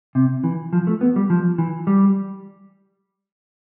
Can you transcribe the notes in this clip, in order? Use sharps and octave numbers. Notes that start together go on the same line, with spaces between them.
C3
E3
F3
A3
B3
G3
F3
E3
G3